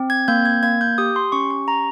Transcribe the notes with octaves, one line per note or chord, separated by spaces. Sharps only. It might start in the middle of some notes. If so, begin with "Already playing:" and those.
Already playing: C4
G#6
A#3 G6
G#6
A#3 G#6
G6
G4 D#6
C6
C#4 C#6
C#6
G4 A#5